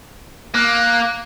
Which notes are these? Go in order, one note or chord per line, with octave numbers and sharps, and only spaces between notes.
A#3 F#6